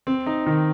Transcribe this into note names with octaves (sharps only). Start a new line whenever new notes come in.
C4
D#4
D#3